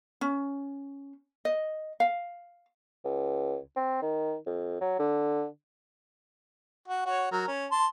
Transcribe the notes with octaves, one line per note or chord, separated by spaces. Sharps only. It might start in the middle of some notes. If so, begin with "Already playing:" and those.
C#4
D#5
F5
C#2
C4
D#3
F2
F#3
D3
F#4
F#4 C#5
F#3 A#4
C#4
A5 C6